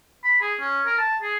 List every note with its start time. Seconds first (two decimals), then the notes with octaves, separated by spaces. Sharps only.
0.24 B5
0.41 G#4
0.60 C#4
0.86 A#4
0.98 A5
1.22 G#4